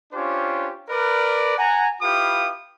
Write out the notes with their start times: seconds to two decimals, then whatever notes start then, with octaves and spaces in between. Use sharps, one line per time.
0.13 C#4 D4 F4 G4 C5 C#5
0.89 A#4 B4 D5
1.58 F#5 G#5 A#5
2.02 E4 F4 G4 B4 F5 D#6